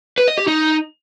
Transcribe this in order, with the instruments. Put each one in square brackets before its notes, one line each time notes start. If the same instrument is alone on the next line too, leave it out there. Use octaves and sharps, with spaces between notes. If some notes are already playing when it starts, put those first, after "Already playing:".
[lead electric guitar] B4
D#5
G4
D#4